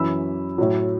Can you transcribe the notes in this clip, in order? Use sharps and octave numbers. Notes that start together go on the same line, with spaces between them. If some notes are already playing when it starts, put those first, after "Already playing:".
Already playing: F#2 E3 B5 E6
A2 F#3